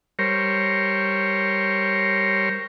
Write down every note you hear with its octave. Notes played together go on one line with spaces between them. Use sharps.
G3 A#4 C5 C#5